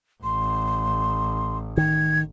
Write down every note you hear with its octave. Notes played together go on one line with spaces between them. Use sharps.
A1 C6
D#3 G#6